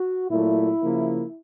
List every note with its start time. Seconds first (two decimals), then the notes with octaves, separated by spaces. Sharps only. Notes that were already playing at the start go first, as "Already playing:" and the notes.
Already playing: F#4
0.30 A#2 F#3 A3 E4
0.82 C#3 F3 A#3